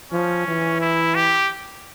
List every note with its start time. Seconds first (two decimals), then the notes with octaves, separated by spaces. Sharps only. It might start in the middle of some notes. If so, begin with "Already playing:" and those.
0.12 F3 C#4
0.47 E3
0.81 E4
1.15 G4